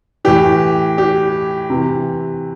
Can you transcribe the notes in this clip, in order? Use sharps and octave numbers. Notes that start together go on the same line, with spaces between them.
A2 E3 G4
G4
C3 E3